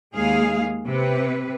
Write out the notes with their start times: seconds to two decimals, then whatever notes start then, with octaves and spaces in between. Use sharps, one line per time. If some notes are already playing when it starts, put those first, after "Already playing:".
0.14 D#2 G#3 G#4 F5
0.87 C3 B4